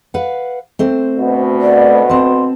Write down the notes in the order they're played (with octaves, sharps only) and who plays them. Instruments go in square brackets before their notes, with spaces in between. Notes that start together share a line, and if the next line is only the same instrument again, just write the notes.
[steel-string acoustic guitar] B4 F5 F#5
A3 C4 C5
[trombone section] D2 B2
[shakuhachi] D5
[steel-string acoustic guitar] C4 A5 [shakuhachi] C6